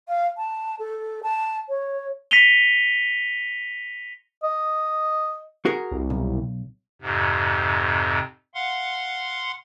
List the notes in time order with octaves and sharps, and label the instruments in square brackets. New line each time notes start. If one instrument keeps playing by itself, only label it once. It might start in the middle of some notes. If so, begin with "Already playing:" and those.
[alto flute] F5
A5
A4
A5
C#5
[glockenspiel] A#6 B6 C#7 D#7 F7 G7
[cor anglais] D#5
[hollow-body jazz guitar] F#4 G#4 A#4
[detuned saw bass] C2
[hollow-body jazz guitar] B1
[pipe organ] F2 G#2 C3
F5 F#5 C6